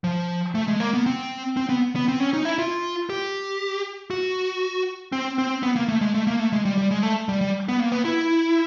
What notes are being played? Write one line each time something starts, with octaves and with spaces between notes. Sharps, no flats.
F3
A3
G#3
A#3
B3
C4
C4
B3
B3
C4
C#4
D#4
E4
F4
G4
F#4
C4
C4
B3
A#3
A3
G#3
A3
A#3
A3
G#3
G3
G3
G#3
A3
G3
G3
B3
A#3
B3
E4